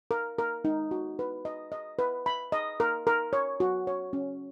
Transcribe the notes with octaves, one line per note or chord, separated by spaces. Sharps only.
A#4
A#4
D#4
F#4
B4
D#5
D#5
B4
B5
D#5
A#4
A#4
C#5
F#4
C#5
C#4